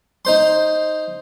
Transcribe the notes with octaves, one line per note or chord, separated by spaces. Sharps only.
D#4 C5 C6